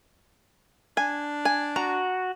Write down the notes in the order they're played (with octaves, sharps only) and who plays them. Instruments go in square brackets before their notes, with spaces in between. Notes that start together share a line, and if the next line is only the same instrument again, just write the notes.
[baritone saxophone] D4 [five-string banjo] G#5
[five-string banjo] G#5
[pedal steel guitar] F#4 [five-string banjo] A#5